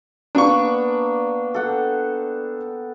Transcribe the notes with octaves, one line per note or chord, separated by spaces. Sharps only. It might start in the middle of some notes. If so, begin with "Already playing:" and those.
A#3 B3 D4 C#6
A4 F#5 G5